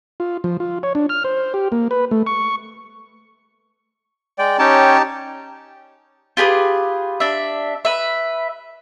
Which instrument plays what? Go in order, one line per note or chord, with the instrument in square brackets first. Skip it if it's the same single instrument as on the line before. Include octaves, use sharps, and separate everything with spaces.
[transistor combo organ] F4
F3
F4
C#5
D4
F6
C5
G4
A#3
B4
A3
C#6
[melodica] G#3 [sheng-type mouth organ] D5 G5
[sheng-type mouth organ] C#4 C#5 G5 [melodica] D#4 G4 A5
[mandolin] F4 G4 G#4 B4
D4 E5
B4 E5